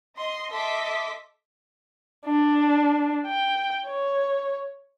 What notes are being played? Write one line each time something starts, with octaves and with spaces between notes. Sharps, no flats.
D#5 C6
A4 D#5 E5 C6 D6 B6
D4
G5
C#5